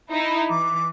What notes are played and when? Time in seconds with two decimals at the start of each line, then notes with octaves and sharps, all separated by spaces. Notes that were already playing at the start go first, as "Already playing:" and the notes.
0.12 D#4 E4
0.50 E3 D6